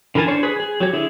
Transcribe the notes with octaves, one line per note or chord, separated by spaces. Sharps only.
D3 E3 A#4 G#5 A5
D4 C5 C#5
G#4 B4
G#4
F#3 G4 C#5
D3 E4 G#4